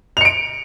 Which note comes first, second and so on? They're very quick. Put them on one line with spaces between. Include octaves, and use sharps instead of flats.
F7 C#7 D7